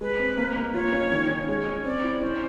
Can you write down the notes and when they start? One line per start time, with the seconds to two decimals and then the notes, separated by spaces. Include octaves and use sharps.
0.01 G#3 B4
0.19 C4
0.38 A#3
0.56 A#3
0.74 F4 C#5
0.93 C#4
1.12 D#3
1.30 C#4
1.48 G#3 C#5
1.67 C#4
1.85 C4 D5
2.04 E4
2.22 C#4 C5